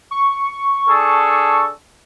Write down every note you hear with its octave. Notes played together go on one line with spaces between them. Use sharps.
C#6
D4 G#4 A4